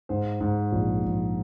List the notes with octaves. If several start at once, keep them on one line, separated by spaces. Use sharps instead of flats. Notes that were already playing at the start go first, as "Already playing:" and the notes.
G#2 C5
G#2
A#1
A#1